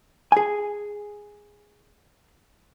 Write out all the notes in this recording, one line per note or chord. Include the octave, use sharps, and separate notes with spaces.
G#4 G#5